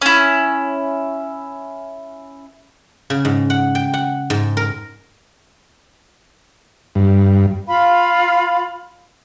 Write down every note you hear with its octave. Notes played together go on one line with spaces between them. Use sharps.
C#4 E4
C#3
G#2
F#5
G5
F#5
G#2
A#4
G2
F4 F5 B5